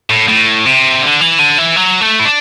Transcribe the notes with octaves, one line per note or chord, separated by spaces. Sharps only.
A2
A2
C3
D3
E3
D3
E3
F#3
A3
E4
D4